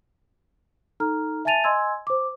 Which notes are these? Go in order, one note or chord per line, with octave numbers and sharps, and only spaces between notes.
D#4 A4 A#5 F6
E5 G#5 A5 A6 D#7 F7
D#5 G#5 C6 E6 G#6
C5 D6